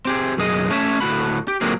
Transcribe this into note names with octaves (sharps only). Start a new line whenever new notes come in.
C4 G4 G#4
B1 F#2 G#4 D#5
A3 C#4 C#5 D#5 E5
D2 A2 F#4 B5
G4
A#2 D3 F#3 G#3 A#3 C4